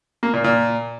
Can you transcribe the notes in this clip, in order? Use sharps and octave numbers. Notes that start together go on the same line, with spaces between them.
A#3
A#2
A#2